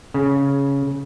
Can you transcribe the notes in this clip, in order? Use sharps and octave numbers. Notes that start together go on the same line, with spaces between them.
C#3